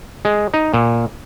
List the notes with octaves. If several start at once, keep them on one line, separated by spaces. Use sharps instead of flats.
G#3
D#4
A#2